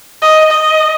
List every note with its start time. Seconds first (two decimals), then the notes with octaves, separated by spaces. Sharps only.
0.22 D#5
0.51 D#5